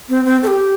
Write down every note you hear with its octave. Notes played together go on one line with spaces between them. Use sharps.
C4
C4
A4
G4